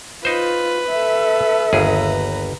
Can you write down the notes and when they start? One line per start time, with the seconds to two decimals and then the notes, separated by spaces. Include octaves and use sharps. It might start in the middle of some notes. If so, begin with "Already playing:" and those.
0.25 D#4 F4 B4 C5
0.89 A4 E5
1.73 G1 D#2 G#4 B4 A#5